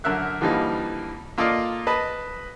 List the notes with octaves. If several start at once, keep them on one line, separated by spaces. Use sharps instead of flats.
F#2 D3 A#4 E5 F#6
D3 E3 F3 G3 A#3 D#4
A#3 F4 A4 D5 D#5 F5
B4 D#5 A5 B5